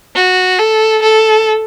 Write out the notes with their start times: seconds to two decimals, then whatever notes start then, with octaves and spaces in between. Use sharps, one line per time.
0.15 F#4
0.59 A4
1.03 A4